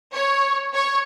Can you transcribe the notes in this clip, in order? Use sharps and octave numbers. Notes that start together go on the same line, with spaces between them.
C#5
C#5